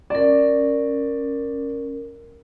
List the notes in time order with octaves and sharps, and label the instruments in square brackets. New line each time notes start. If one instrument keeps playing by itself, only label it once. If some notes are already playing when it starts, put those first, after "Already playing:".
[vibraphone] C#4 A#4 [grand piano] D5